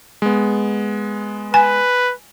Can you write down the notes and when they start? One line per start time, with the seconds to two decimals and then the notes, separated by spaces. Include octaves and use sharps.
0.22 G#3 B3
1.54 B4 G#5